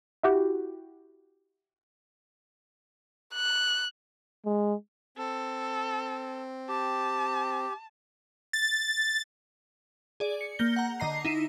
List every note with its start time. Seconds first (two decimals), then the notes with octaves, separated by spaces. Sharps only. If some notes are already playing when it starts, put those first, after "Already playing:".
0.23 E4 F#4 G4
3.34 F#6
4.46 G#3
5.17 C4 A4
6.69 G4 A5
8.53 A6
10.20 G#4 D5
10.41 C#7
10.59 A#3 G6 A#6 G7
10.76 F#5 A#5
11.00 D3 D#5 A#5 C7
11.25 D#4 E4 D#7